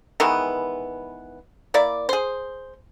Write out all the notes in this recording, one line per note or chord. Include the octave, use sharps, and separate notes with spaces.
D#3 E3 G#3 B3
A#3 E4 D5
G#4 C5